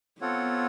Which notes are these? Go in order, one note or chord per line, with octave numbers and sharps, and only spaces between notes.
B3 C4 F4 A4 C#5 F#5